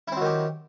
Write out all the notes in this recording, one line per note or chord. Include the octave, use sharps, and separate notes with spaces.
D#3 F#3 C4 E4 G4